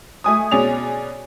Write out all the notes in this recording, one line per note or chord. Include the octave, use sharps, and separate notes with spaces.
A3 G#5 D#6
B2 C#4 G#4 D5 F7